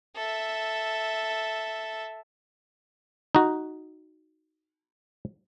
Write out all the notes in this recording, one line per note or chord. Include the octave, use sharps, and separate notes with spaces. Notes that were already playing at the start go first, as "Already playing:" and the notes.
A4 E5
D#4 F#4